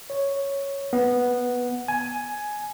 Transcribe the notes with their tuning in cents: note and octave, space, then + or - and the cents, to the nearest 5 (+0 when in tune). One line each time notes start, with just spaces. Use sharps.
C#5 +0
B3 -5
G#5 +10